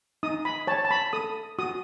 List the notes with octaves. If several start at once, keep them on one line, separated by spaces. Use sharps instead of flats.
D#4 D#6
B5
C#5 A5
A5
B5
A4 D#6
F#4 D#6